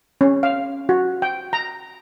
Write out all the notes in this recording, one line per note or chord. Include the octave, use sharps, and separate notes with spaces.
C#4
F5
F#4
G5
A#5